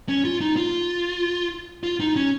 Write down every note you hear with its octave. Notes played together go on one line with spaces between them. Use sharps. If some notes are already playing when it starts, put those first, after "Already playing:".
C#4
F4
D#4
F4
F4
D#4
C#4